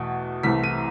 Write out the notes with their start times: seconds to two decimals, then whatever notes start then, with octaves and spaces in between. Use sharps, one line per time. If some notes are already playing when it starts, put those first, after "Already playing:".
Already playing: E2 B2 A3
0.43 C2 C3 E3 A3 B6
0.64 D#7